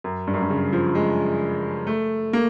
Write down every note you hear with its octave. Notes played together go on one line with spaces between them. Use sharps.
F#2
G2
F#2
G2
C#3
F3
G#3
A3
A#3